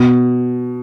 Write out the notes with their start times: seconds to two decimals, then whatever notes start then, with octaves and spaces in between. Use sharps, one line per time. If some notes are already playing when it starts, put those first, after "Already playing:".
Already playing: B2